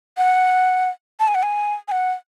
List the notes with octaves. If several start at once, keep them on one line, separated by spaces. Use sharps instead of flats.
F#5
A5
G#5
F#5
G#5
G#5
F#5